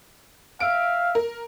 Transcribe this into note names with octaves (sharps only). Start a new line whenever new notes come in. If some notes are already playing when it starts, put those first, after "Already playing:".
E5 F5 D7
A#4